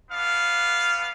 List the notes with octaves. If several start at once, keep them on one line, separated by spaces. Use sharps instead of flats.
B3 D4 F5